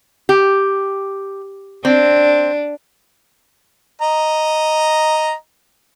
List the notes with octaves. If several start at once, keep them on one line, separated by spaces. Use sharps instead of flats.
G4
C4 D4
D#5 A#5